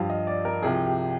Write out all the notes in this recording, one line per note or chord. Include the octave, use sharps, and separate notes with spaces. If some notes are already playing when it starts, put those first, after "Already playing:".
Already playing: G2 F3 F5
D#5
D5
A#4
C2 C3 F3 G#4
G4